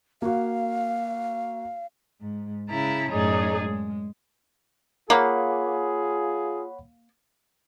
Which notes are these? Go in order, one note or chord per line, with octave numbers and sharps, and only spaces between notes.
A#3 F#4 F5
G#2
C#3 E4 A5 A#5
F#2 A2 D#4 G#4 C#5 D5
G#3
A#3 F4 G#4 C#5 F#5 B5